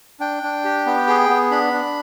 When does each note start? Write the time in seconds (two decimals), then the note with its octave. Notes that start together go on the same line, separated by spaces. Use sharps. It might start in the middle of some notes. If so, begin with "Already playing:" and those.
0.20 D4 G5
0.43 D4
0.65 G4
0.86 B3
1.08 G#4
1.29 B3
1.51 D4 B5
1.73 D4